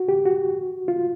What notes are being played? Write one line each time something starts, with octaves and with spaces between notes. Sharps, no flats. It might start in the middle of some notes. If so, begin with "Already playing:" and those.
Already playing: F#4
G4
F#4
F4